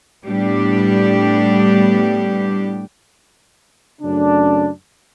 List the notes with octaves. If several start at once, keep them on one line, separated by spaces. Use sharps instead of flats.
A2 G3 B3 D4 G4
F#2 C#3 A3 D4